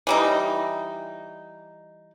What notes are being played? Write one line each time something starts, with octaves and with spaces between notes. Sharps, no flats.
E3 G3 D#4